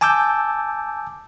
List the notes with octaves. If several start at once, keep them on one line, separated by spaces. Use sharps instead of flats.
G#5 A5 D6 E6 G6